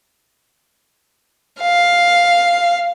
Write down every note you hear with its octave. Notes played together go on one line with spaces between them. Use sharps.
F5